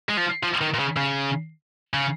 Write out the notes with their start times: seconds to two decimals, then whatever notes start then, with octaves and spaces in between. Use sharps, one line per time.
0.09 G#3
0.17 F3
0.43 F3
0.61 D#3
0.74 A#2
0.79 C#3
0.96 C#3
1.94 C#3